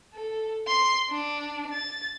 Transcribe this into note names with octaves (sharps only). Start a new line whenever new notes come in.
A4
C6 C7
D4
A6